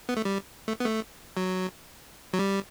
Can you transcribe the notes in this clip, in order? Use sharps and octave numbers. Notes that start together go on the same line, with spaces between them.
B3
A3
G3
A3
B3
A3
F#3
F#3
G3